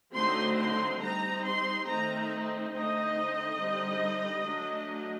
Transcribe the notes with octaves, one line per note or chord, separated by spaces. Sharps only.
D3 F#3 A3 C4 D#4 C6
C6
G3 C4 D#4 A#5
C6
D#3 A3 C4 D#4 A#5
D3 A3 C4 D#4 D#5
D3 G3 C4 D#4
F#3 A3 D4